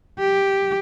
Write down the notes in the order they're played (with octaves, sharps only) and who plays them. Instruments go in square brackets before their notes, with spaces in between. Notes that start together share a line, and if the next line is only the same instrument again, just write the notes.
[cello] G4